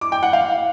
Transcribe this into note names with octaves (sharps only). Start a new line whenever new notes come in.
D6
G5
F#5
F5